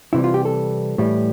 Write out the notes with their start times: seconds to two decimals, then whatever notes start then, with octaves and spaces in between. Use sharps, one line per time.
0.13 C3 E3 G3 E4
0.24 F4
0.34 G4
0.45 A4
0.98 A2 E3 G3